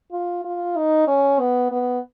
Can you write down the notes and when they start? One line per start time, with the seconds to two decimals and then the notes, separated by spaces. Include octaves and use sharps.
0.12 F4
0.44 F4
0.77 D#4
1.08 C#4
1.40 B3
1.72 B3